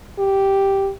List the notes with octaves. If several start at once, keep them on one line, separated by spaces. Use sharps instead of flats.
G4